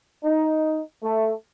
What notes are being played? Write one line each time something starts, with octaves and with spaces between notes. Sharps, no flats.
D#4
A3